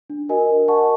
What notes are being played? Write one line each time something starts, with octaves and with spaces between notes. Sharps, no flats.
D4
F#4 A#4 D#5 G#5
A#4
D#5 F#5 A5 C#6